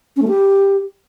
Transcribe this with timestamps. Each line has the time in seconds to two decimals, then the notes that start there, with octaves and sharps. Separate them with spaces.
0.16 C#4
0.22 A3
0.28 G4